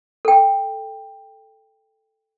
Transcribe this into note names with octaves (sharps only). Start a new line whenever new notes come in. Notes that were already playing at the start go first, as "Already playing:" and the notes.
A4 G5